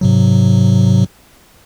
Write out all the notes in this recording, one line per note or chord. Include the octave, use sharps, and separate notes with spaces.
G#2 C3 F#3